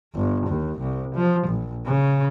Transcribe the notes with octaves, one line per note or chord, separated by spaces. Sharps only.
G1
D#2
C2
F3
A#1
C#3